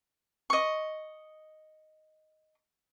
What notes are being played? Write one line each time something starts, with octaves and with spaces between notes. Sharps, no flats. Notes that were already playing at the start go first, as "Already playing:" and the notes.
D#5 C#6